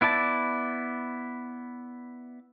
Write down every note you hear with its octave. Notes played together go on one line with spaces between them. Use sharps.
B3 E4 D5 A5